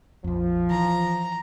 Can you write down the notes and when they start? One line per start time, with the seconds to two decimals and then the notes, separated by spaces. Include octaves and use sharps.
0.24 A#1 F2 F3
0.70 E3 A#5